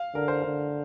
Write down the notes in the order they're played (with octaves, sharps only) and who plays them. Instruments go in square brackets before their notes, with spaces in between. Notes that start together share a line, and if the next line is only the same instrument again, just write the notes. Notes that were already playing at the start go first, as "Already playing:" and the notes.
Already playing: [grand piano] F5
[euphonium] D3 [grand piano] A#4
[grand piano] C5
[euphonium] D3 [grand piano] A#4